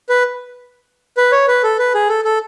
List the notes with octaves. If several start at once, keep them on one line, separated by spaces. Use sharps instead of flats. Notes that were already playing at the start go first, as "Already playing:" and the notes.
B4
B4
C#5
B4
A4
B4
G#4
A4
A4